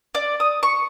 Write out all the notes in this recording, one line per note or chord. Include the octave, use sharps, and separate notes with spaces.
D5
D#6
C#6